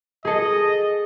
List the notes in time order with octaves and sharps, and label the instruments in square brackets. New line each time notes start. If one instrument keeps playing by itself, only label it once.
[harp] G#4 A4 [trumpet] D#5